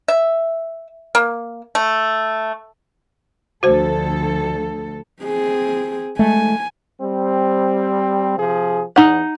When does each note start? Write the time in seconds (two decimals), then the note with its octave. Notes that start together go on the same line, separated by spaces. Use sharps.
0.08 E5
1.15 A#3
1.75 A3
3.63 D2 F3 F#4 A4 C5
5.23 C4 G#4
6.19 G#3 A3 G#5
7.00 G3 C4
8.38 C3 F3 G#4
8.96 E2 D#4 F#5